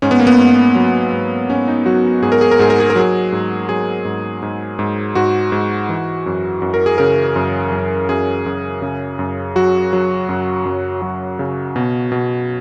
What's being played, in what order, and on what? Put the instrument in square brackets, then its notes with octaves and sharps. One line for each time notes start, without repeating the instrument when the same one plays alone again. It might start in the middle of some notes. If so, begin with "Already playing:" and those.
[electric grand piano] G#2 C#4
B3
A#3
B3
G#2
F#3
G#2
G#2 C#4
D#4
F#3 F#4
G#2 G#4
A#4
G#4
A#4
G#2 G#4
A#4
G#4
A#4
F#3 G#4
G#2
F#3 G#4
G#2
G#2
G#2
G#2 F#4
G#2
E3
F#2
F#2
A#4
G#4
C#3 A#4
F#2
F#2
F#2 G#4
F#2
C#3
F#2
F#3 F#4
F#3
F#2
F#2
F#3
C#3
B2
B2